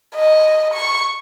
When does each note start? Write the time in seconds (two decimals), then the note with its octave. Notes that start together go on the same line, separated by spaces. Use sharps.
0.16 D#5
0.74 C#6